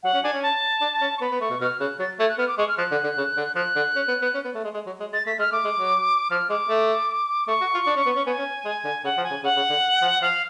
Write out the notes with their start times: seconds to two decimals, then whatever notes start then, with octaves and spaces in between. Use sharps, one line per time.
0.03 F#3 F#5
0.14 C#4
0.23 D4 G#5
0.33 C#4
0.43 A5
0.81 D4
1.01 C#4
1.17 C#6
1.21 B3 B5
1.31 B3
1.41 A3 C#6
1.50 B2
1.61 B2 F6
1.80 C#3 F#6
1.99 F#3 A6
2.20 A3 G#6
2.29 F#6
2.38 B3 F6
2.48 D6
2.58 G#3 C#6
2.68 F6
2.78 F3 F#6
2.91 D3
3.04 D3
3.18 C#3
3.37 D3
3.55 F3 F#6
3.76 D3
3.96 C#4
4.08 B3
4.22 B3
4.34 C#4
4.45 B3
4.55 A3
4.64 G#3
4.74 G#3
4.86 F#3
5.00 G#3
5.13 G#3 A6
5.26 A3 B6
5.39 G#3 F6
5.52 A3 D6
5.64 G#3
5.78 F#3
6.31 F3 F6
6.50 G#3 D6
6.69 A3
7.47 A3 C#6
7.61 F#4
7.74 F4
7.87 D4
7.96 C#4
8.06 B3
8.16 C#4
8.26 B3 G#5
8.39 C#4
8.65 G#3
8.84 D3
9.04 C#3 F#5
9.17 F3
9.24 G#5
9.30 C#3
9.43 C#3 F#5
9.56 C#3
9.70 D3
10.02 F3
10.21 F3 F5